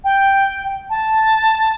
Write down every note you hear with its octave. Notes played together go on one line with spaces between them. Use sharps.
G5
A5